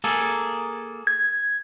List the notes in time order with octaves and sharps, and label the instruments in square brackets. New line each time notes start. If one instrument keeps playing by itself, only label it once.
[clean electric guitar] A#3 G#4 A4
[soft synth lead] G#6